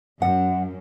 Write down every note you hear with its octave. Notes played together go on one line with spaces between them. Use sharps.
F#2 F#5